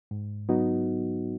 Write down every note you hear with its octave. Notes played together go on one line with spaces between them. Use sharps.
G#2
F#3 B3 D#4 F#4